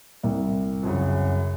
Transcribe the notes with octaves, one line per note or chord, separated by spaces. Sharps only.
C2
F#2 C#3